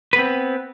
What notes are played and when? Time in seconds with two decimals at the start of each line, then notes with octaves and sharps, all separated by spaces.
0.13 B4
0.16 B3
0.19 C4